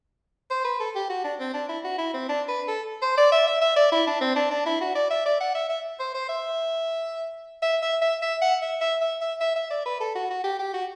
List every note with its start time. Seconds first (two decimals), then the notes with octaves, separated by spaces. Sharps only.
0.51 C5
0.65 B4
0.80 A4
0.95 G4
1.09 F#4
1.24 D4
1.40 C4
1.54 D4
1.69 E4
1.84 F#4
1.98 E4
2.14 C4
2.29 D4
2.48 B4
2.68 A4
3.02 C5
3.18 D5
3.32 E5
3.47 E5
3.62 E5
3.76 D5
3.92 E4
4.07 D4
4.21 C4
4.36 D4
4.51 D4
4.66 E4
4.81 F#4
4.95 D5
5.10 E5
5.26 D5
5.41 F#5
5.55 E5
5.69 E5
6.00 C5
6.14 C5
6.29 E5
7.62 E5
7.82 E5
8.02 E5
8.22 E5
8.42 F#5
8.62 E5
8.81 E5
9.01 E5
9.21 E5
9.40 E5
9.56 E5
9.71 D5
9.86 B4
10.00 A4
10.15 F#4
10.30 F#4
10.44 G4
10.59 G4
10.74 F#4